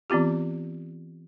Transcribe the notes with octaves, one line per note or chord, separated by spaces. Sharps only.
E3 B3 C4 F4 G4